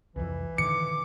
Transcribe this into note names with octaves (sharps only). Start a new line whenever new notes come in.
C2 F2 E3
A2 D3 D#3 D6 C#7